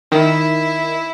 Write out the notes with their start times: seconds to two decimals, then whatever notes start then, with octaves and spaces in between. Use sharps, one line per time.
0.12 D#3 E4